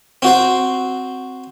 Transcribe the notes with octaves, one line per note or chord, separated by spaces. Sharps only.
C4 F#4 C5